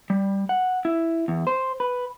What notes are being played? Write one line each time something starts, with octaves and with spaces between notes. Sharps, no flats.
G3
F#5
E4
E2
C5
B4